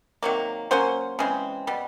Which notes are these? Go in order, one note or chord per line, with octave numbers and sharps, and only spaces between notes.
C3 D#3 F#3 A#3
F#3 A#3 C#4 C5
C#3 E3 G#3 C4
B2 G3